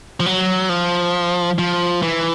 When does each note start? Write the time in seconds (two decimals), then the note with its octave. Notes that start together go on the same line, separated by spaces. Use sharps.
0.20 F3
0.26 F#3
0.69 F3
1.59 F3
2.02 E3